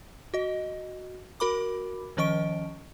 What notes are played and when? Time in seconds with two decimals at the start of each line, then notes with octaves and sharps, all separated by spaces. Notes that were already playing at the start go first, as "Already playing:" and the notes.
0.34 F#4 D#5
1.40 F#4 A#4 B5 D6
2.17 D#3 F3 C#4 D#5 C#6 D7